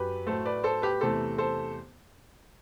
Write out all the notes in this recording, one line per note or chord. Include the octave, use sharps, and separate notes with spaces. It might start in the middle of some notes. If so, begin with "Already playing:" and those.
Already playing: F#2 F#3 G4 B4
A2 F#3 A3 A4 C5
B4 D5
A4 C5
G4 B4
E2 C3 E3 A3 A4 C5
A4 C5